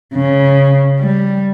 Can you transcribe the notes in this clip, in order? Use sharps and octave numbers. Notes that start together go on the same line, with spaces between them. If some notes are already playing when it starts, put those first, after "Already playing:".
C#3
G3